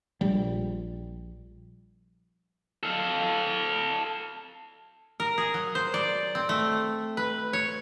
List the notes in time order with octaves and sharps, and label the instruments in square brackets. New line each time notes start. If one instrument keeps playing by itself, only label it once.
[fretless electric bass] A#1 G3
[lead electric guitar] A4 F5
[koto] A#4
G#4
F#3
C5
D5
C4
A3
B4
C#5